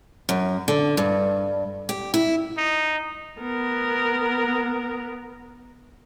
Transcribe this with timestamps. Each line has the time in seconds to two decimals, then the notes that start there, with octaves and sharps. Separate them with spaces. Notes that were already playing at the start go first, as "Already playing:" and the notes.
0.29 F#2
0.68 D3
0.97 G2
1.89 G4
2.14 E4
2.58 D#4
3.41 B3 A#4